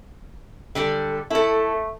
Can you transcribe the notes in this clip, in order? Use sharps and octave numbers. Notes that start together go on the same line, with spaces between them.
D3 G3 A4
A3 E4 A4